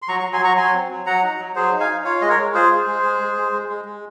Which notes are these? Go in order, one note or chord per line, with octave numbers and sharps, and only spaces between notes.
C6
F#3 A#5 C#6
F#3 A#5 C#6
G#5 C6
F#3 A#5 C#6
F#3 G#5 C6
C4
F#3
F#3 F#5 A#5
D#4
F#3
F#3 G#4 C5
D#4
F5 G#5
D#4
F4 C#5 F5
G#3 D#5
A#4 C#5
G#3
F4 G#4 C5
G#3
G#3
G#3
G#3
G#3
G#3
G#3
G#3